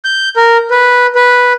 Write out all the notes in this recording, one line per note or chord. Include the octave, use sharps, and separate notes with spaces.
G6
A#4
B4
B4